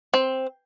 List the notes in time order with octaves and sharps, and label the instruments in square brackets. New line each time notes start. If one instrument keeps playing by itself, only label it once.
[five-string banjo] C4